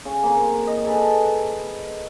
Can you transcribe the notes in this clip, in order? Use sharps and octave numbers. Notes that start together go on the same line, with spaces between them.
C#3
A#3 C4
D#5
G#4 A4 B4